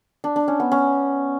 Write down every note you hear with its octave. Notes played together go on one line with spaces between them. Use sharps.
D4
D4
C#4
B3
C#4